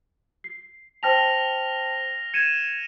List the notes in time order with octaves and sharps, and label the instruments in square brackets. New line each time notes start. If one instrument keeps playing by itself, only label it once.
[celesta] C7
[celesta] C5 G5 A5 [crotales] F6 A#6 F7
[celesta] G#6 [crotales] C#7 D#7 E7